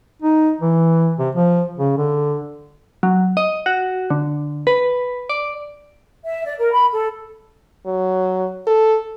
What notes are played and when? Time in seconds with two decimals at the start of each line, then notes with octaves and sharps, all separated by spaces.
0.22 D#4
0.61 E3
1.19 C3
1.35 F3
1.77 C#3
1.98 D3
3.03 F#3
3.37 D#5
3.66 F#4
4.10 D3
4.67 B4
5.30 D5
6.25 E5
6.45 D5
6.58 A#4
6.72 B5
6.91 A4
7.86 F#3
8.67 A4